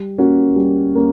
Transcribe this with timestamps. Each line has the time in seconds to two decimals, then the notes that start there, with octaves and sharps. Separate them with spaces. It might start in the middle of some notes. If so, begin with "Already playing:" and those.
Already playing: G3
0.18 A#3 C#4 F#4
0.56 G3
0.95 A#3 C#4